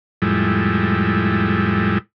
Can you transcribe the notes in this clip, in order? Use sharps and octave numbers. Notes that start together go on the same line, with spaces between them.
F2 A2 G3 G#3 E4